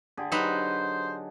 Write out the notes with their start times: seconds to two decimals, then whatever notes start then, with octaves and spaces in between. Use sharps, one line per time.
0.17 D3 G4 G#4
0.32 F#3 D#4 B4 C5